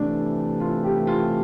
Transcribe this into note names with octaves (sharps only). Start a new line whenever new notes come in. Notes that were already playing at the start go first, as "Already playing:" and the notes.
Already playing: C3 E3 A3 D4
F4
G4
F4